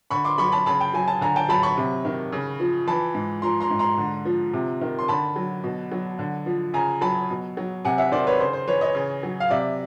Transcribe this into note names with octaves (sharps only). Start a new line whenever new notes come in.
D3 B5 C#6
C6 D6
F#3 B5 C#6
A5 B5
C#3 A5 B5
G5
F#3 G#5
A5
D3 G#5 A#5
G5 A5
F#3 A5 B5
B5 C#6
C3
D#3
C#3
F3
E3 A5 B5
G#2
F3 A#5 C6
A#5 C6
G#2
A#5 C6
D3
F3
C3
D#3
C6
D3 A5 B5
F#3
B2
F#3
D3
F3
C#3 G#5 A#5
F#3 A5 B5
B2
F#3
C3 F#5 G#5
E5 F#5
D#3 C5 D5
B4 C#5
C#3 C5
C5
E3 B4 C#5
C#5 D#5
C#3
F#3
F5
C3 D5 E5